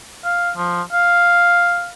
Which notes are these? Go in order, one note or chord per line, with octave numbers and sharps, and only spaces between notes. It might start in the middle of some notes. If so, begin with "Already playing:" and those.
F5
F3
F5